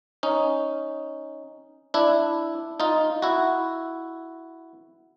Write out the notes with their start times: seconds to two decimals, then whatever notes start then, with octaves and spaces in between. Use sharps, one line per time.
0.23 C#4 D#4
1.94 D4 E4
2.80 D#4 F4
3.22 E4 F#4